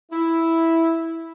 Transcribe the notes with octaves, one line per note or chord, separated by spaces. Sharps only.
E4